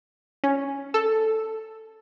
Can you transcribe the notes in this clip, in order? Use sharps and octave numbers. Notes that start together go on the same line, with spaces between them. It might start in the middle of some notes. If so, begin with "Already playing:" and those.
C#4
A4